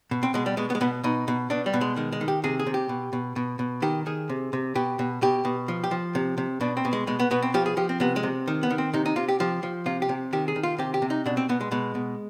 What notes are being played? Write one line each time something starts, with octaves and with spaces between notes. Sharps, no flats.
B2
C4
B2 G#3
G3
B2 G#3
B3
G#3
B2 B3
B2 D#4
B2
B2 D4
G3
B2
G#3
D#3 G#3
G#3
D#3
G4
C3 G#4
G#4
C3
G4
B2
B2
B2
B2
D#3 G4
D#3 G#4
C3
C3
B2 G4
B2
B2 G4
B2
F3
G4
F3
C3
C3
B2 D4
C4
B2
G#3
B2 G#3
B3
B2 B3
C4
F3 G4
G#4
F3 G4
C4
C3 B3
G#3
C3
D#3
B3
D#3
C4
C3 D#4
D#4
C3 F4
G4
F3 G4
F3
C3 F4
G4
C3
D#3 G4
G#4
D#3
F4
C3 G4
G4
C3
D#4
B2 D4
C4
B2 B3
G#3
B2 G#3
B2